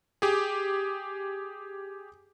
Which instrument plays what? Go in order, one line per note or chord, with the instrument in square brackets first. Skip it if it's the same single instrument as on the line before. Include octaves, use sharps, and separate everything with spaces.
[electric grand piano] G4 G#4